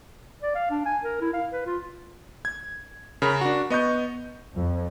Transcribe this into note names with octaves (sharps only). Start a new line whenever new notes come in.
D5
F5
D4
G#5
A#4
E4
F5
B4
F4
G#6
C#3 A#4 B5
D4 F#4
B3 D#5 C#6 G6
F2